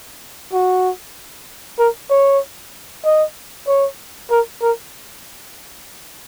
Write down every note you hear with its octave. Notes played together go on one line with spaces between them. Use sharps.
F#4
A#4
C#5
D#5
C#5
A#4
A#4